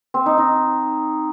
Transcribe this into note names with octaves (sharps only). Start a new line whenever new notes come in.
C4
D#4
D#4